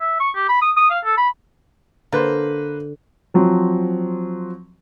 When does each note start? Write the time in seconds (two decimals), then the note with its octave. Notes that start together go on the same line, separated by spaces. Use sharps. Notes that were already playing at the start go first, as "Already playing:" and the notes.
0.01 E5
0.20 C#6
0.35 G4
0.49 B5
0.62 D#6
0.76 D#6
0.90 F5
1.04 A4
1.17 B5
2.12 D3 A#3 B4 C5
3.34 F3 F#3 C4